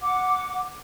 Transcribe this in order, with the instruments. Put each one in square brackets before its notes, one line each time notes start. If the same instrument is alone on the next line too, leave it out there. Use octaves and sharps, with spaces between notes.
[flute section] F#5 D6